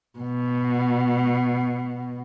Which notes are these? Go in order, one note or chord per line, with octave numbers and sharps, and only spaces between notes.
B2